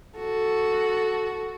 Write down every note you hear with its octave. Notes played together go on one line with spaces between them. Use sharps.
F#4 A4